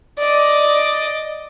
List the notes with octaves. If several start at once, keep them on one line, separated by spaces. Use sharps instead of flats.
D5 D#5